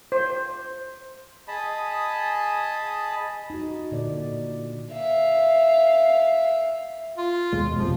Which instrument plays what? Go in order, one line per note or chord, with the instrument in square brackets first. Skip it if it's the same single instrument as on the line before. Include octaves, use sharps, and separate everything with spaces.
[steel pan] C5
[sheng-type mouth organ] G#4 D#5 A5 B5 D#6
[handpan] D#4 F#4
A#2 D3 D5
[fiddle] E5 F5
[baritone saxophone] F4
[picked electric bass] D#2 B2 G#3
[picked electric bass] G#1 F2 C3 [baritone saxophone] F3